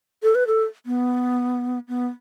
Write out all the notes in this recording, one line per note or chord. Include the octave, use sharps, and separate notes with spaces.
A4
B4
A4
B3
B3